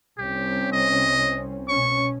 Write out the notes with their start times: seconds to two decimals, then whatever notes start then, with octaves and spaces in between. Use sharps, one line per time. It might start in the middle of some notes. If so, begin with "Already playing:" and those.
0.18 C2 C4 C#4 G4
0.72 D#5
1.69 B2 C#4 C#6